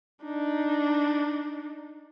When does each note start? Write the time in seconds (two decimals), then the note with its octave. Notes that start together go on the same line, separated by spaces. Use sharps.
0.24 D4 D#4